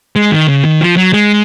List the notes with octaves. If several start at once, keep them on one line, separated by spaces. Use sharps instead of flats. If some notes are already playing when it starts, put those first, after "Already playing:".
G#3
D#3
C#3
D#3
F3
F#3
G#3